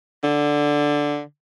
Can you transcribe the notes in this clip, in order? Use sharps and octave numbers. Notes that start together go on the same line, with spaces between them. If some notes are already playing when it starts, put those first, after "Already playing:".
D3